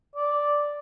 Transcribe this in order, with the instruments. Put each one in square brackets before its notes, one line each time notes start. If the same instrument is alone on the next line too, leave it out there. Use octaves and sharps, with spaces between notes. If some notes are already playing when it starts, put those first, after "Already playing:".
[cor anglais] D5